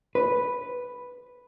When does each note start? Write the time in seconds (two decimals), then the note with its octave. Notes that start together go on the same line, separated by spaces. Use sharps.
0.15 B4